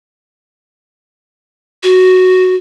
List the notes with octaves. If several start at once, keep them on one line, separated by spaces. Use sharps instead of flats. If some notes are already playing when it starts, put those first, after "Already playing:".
F#4